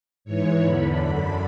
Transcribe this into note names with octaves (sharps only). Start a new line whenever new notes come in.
G#2 E3 C#5
E2 D3 B5
F#2 D3